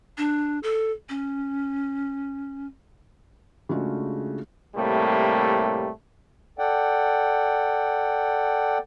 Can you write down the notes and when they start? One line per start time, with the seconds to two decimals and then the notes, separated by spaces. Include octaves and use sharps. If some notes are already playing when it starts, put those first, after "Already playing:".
0.18 D4
0.63 A4
1.09 C#4
3.69 C#3 G#3 A3 D4 F4 F#4
4.76 A2 C3 G3 A3 A#3
6.59 A4 D5 F#5 G5